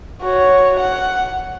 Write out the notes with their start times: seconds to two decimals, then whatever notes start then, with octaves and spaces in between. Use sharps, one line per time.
0.22 F#4 C#5
0.80 F#5